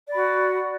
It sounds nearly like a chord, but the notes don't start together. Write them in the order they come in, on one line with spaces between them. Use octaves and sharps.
D5 B5 F#4